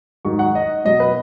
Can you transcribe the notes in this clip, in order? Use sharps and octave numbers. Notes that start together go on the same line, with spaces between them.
G#2 D#3 F#3 C#6
F#5
D#5
B2 F#3 D#5
B4